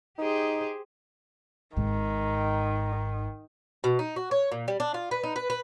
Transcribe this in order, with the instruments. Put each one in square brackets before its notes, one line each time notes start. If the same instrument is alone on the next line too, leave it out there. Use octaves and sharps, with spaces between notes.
[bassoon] D#4 [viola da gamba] G4 G#4 C5
[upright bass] G#1 G#2 [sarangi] D#3
[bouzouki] B2
D#4
F#4
C#5
A#2
G3
D4
F4
B4
D#4
B4
B4